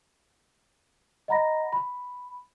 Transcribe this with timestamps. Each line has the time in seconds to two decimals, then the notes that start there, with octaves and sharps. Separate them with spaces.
1.28 D#5 F#5 A#5 B5 A#6
1.73 B5